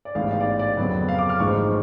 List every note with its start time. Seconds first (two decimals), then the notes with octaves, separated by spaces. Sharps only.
0.05 D5
0.15 A1 G#2 G#3 B3 F5
0.31 F5
0.40 D5
0.59 D5
0.77 F2 C#3 F#3 B3
1.09 F5
1.18 D6
1.29 F6
1.40 A1 G#2 F3 G#3 C#6